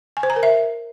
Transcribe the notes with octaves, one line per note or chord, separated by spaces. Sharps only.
G#5
C5
A#5
A#4
E5